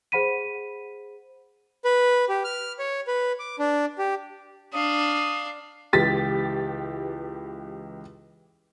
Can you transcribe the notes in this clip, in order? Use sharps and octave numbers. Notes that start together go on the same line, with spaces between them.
G#4 C5 F#5 B5 B6 D#7
B4
G4
F6
C#5
B4
D6
D4
G4
D4 F5 D#6
C#2 E3 G4 A6 B6